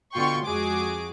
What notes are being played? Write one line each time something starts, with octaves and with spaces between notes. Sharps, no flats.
B2 D3 F4 G5 C6 C#6
F2 G#3 F#4 G#4 D6